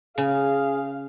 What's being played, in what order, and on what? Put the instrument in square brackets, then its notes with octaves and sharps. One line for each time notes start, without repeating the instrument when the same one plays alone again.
[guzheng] C#3 [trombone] G#4 [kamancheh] F5